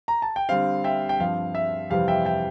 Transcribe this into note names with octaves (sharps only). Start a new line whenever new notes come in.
A#5
A5
G5
D3 G3 C4 F5
E5 G5
G5
G2 F3 C4 F5
E5
F2 C3 E3 G3 C4 F5
E5 G5
E5 G5